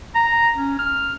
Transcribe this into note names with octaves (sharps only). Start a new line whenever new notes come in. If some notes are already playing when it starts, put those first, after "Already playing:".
A#5
C#4
F6